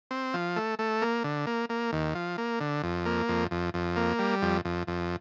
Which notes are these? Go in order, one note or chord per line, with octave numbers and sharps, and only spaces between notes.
C4
F3
A3
A3
A#3
D3
A#3
A#3
D#2
F3
A#3
D3
F2
A#3
F2
F2
F2
A#3
G3
F2
F2
F2